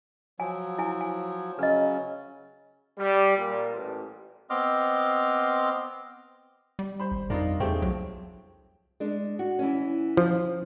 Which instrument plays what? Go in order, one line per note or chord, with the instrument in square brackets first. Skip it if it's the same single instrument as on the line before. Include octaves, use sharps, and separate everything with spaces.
[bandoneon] F3 F#3 [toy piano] G#5
[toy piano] E4 G#5
G#5
[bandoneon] C#3 F#3 C#4 [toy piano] B4 D#5
[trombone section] G3
A#2
A1
[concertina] B3 C4 D#5 C6 D6 F6
[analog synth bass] G3
[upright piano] C5 B5
[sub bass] G#1
[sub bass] F2 [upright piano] D4 D#4 [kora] F4 A#4
[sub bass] E2 [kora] C#3 A3 C4 [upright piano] D#4 G4
[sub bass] B1 [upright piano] A2 [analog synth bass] F#3
[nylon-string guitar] G#3 D4
F#4
E3 C#4
[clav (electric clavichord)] F3